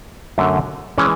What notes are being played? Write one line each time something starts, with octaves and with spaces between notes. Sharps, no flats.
F#2 D3 F#3 A3
E3 G#3 C#4